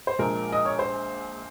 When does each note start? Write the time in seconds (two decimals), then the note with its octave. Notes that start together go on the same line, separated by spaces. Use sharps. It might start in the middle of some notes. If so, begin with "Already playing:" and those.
0.07 C5
0.19 A#1 A#2 F3 G#3 A#4
0.52 D#5
0.65 C#5
0.79 C5